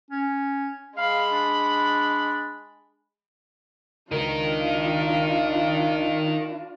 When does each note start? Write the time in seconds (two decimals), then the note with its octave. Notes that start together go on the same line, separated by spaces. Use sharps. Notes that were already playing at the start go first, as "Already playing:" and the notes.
0.10 C#4
0.97 G#3 F5 B5
1.31 D4
4.11 C#2 D4 D#4 F4 A#4